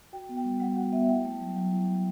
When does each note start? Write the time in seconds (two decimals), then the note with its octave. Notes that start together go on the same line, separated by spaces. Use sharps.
0.13 F#4 G5
0.29 B3
0.37 G5
0.44 G3
0.60 G3 F#5
0.76 F#4 F#5
0.92 B3 E5
1.08 E4 G5
1.25 A3
1.40 F#3
1.56 F#3
1.73 E4
1.88 A3